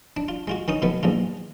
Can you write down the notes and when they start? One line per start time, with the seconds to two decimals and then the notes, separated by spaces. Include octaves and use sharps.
0.17 D4
0.28 F4
0.47 G#3 F4 F#4
0.68 D#3 C#4 D#4 D#6
0.82 B2 D#3 F3 A3 B3
1.03 A#1 E2 G#2 F4